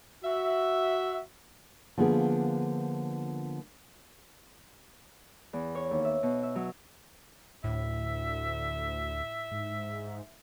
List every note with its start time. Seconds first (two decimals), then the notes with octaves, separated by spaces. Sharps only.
0.24 F#4 E5
1.98 D3 F3 A#3 B3 F4 G#4
5.53 E2
5.75 C#5
5.91 D#2
6.05 E5
6.23 B2
6.43 E5
6.55 F#3
7.64 D2 A2 E5
9.51 G#2